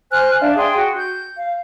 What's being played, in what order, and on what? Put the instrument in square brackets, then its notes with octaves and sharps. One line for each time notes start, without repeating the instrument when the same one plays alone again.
[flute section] C5 G#5 F6 F#6
D4 D5 E5 F5
G#4 G5 C6
F#4
G6
F5